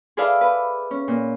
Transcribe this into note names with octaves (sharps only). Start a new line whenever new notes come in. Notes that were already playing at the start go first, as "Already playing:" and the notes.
G#4 A4 B4 D5 E5 F5
B4
C#4
A#2